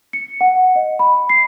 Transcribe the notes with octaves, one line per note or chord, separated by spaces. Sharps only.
C#7
F#5
D#5
B5
C7